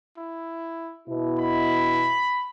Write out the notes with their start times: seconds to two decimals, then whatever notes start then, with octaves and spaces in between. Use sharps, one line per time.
0.18 E4
1.08 B2 E4
1.39 B5